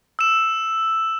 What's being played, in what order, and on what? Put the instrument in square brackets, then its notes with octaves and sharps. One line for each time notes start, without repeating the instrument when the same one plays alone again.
[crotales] E6 E7